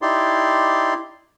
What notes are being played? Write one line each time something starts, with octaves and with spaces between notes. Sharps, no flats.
D#4 E4 G4 D5 C6